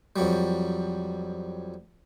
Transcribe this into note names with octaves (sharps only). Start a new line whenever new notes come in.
F2 F#3 G3